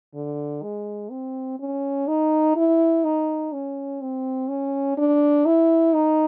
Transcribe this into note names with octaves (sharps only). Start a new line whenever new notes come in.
D3
G#3
C4
C#4
D#4
E4
D#4
C#4
C4
C#4
D4
E4
D#4